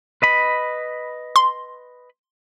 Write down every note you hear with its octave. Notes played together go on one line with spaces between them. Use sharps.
B4 D#5 B5
C6